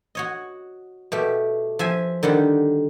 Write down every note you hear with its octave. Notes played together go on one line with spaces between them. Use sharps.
F#4 C#5 D#5
B2 A3 G4
F3 E5 G#5
D3 D#3 G3 F#5